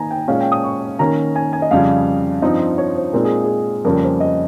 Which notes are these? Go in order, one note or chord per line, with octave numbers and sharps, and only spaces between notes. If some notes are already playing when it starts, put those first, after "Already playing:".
Already playing: D#3 A#3 D#4 G#5 A#5
G5
A#2 G#3 C#4 F5
G5
D#6
C#6
D#3 A#3 C#4 A#5
G#5
G#5
D#5
F2 C#3 G3 F5
G2 F3 C4 D#4
C#5
C5
A#2 G#3 C4 D#4 A#4
G#4
G#4
F2 C#3 G3 A#3 C#4 A#4
C5
D#5